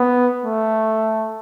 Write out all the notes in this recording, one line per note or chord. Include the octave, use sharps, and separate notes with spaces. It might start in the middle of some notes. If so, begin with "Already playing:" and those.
Already playing: B3
A3